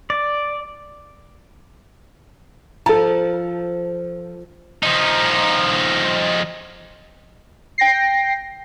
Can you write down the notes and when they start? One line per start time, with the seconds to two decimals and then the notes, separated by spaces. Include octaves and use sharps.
0.10 D5
2.86 F3 A4 A5
4.83 F3 D#4
7.78 G5 A#6 C7